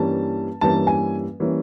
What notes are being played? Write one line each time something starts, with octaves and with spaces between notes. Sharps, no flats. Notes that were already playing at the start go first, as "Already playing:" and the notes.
Already playing: G2 E3 G3 A#3 C#4 A5
G2 E3 G3 A#3 C#4 A5
G#5
E3 G3 A#3 C#4